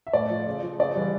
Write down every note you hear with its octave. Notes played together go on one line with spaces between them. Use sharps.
E5
A2 D5
F3
C#3
F3
C#3 D5
E3 G3